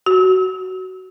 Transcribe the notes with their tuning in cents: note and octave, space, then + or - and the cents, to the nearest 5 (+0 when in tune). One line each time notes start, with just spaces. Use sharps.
F#4 +15